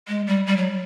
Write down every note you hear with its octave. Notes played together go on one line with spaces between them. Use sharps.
G#3
G3
G3
F#3